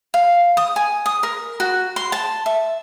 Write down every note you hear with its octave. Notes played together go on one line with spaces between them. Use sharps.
F5
D#6
G#5
D#6
A#4
F#4
C6
A5
E5